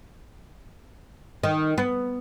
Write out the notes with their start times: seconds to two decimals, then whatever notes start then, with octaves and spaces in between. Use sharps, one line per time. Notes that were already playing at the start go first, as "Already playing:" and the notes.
1.43 D#3
1.78 B3